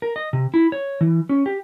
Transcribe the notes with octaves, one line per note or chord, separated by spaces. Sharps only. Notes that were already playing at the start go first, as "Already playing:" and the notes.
A#4
D#5
C3
E4
C#5
E3
C#4
G4